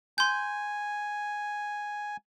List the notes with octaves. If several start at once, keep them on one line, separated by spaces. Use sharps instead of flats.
G#5 C6 G6